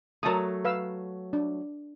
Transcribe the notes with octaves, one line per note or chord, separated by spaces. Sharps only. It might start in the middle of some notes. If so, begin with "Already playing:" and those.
F#3 A3 A#4 A5 D#6
B4 F5 E6
D4